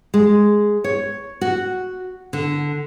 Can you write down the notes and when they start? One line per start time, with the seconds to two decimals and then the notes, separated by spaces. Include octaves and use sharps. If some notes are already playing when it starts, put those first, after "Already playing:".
0.14 G#3
0.84 C#5
1.41 F#4
2.33 D3